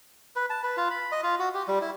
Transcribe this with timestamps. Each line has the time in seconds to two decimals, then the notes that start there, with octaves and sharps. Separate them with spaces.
0.36 B4
0.50 A5
0.64 B4
0.77 F4
0.91 B5
1.12 D#5
1.23 F4
1.39 F#4
1.54 G4
1.68 G3
1.81 E4